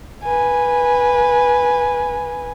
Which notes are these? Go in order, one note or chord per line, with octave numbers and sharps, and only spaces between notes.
B4 G#5